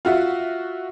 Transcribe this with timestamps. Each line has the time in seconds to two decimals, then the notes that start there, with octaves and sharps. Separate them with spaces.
0.05 F4 F#4 E5